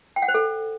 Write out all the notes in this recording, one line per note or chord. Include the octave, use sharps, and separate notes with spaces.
G5
F#5
C5
A4